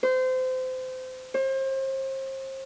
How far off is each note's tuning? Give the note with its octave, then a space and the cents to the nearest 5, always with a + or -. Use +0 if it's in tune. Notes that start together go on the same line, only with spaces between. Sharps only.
C5 -25
C5 +35